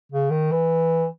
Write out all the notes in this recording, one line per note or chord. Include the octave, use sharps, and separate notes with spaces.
C#3
D#3
E3